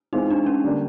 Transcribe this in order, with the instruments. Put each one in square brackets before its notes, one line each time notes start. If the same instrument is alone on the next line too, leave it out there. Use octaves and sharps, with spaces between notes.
[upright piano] E3 G#3 C4 F4 [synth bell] D#4
[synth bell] D4
C#4
[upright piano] D3 G3 A#3 D4 G4